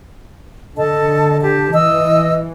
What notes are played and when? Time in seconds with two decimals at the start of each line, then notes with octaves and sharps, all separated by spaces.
0.77 D3 A4 D#5 A5
1.41 G4 A5
1.73 E3 D#5 E6